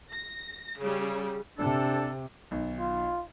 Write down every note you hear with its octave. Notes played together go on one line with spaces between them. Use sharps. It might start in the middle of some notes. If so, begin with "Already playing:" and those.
A#6
C#3 G3
C3 D4 A4
B1 D#3
F4